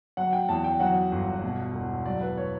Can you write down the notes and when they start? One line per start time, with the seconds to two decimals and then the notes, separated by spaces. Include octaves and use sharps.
0.17 F#3 F#5
0.33 G5
0.49 E2 A5
0.64 G5
0.80 F#3 F#5
1.12 G1
1.43 B2
1.74 E1
2.05 F#3 D5
2.21 B4
2.37 C#5